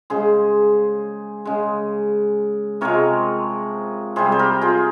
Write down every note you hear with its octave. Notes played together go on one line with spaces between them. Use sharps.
C#3 G#3 G#4 C5
C#3 G#3
C3 F3 G#3 A#4 C#5
C3 G3 G#4 C5
C5
G4 A#4
F4 G#4